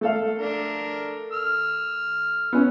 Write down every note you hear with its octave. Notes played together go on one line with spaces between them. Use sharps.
A3 A4 F5
D4 A#4
E6 F6
B3 C#4